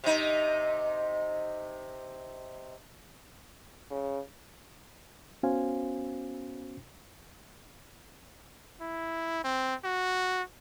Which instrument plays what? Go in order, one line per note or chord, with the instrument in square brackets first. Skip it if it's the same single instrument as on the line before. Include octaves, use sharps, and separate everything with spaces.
[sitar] C3 D#4
[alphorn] C#3
[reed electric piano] B3 C#4 F#4 C5 F5 G#5
[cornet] E4
C4
F#4